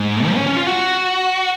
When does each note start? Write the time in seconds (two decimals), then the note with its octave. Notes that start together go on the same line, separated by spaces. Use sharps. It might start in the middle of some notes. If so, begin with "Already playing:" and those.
Already playing: G#2
0.25 F3
0.36 C#4
0.46 C#4
0.56 F4
0.67 F#4